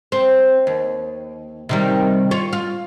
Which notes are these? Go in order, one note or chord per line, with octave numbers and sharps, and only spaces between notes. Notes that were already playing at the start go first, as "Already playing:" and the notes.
C4
D#2
C3 D#3 G3
F4 C#5
F4